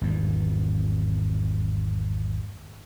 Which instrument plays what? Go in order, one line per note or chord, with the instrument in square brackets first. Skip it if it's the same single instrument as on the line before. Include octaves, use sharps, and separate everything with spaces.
[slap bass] G#1 E2 G2